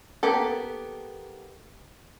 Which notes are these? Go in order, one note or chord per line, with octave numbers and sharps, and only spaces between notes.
A#3 B3 G4 A4